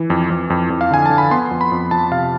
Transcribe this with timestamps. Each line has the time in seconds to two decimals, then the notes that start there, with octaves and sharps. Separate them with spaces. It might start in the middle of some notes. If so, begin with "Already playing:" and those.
Already playing: E3
0.10 F2
0.30 F2
0.50 F2
0.70 F2
0.81 F5
0.91 D3 G#5
1.06 D3 A5
1.18 B5
1.31 B3 C6
1.51 F2
1.61 B5
1.72 F2
1.91 F3 A5
2.11 C3 F5